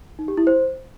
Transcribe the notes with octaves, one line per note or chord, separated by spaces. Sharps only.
D#4
G4
E4
C5